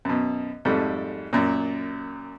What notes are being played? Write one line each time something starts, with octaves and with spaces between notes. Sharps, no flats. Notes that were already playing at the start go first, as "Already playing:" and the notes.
F#2 B2
F2 G#2 G3 A3
F#2 A#2